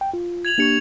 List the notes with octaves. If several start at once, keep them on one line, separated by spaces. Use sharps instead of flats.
G5
F4
G#6 F7 F#7
A#3 D4 G4 C#6 C#7 F7